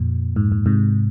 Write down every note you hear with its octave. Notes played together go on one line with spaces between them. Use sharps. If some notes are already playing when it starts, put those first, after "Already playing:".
Already playing: F2 A#2
G#2
G#2
G#2 C3